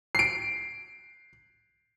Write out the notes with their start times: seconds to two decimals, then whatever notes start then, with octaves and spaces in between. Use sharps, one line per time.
0.15 C7 D7